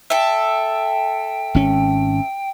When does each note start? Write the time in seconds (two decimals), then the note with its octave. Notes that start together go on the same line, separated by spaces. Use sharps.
0.10 A4 E5 G5
1.55 G#1 C#4